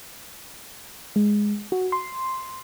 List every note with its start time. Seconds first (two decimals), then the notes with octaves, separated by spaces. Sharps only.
1.16 G#3
1.72 F#4
1.92 C6